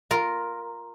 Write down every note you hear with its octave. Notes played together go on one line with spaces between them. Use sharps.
F4 A#4